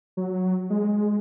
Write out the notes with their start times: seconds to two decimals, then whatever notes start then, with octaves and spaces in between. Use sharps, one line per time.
0.17 F#3
0.70 G#3